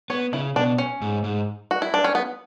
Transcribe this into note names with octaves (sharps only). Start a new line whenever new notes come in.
B3 C#5
C#3 E4
B2 D4
C#4
G#2
G#2
F#4
E4
D4
C#4
B3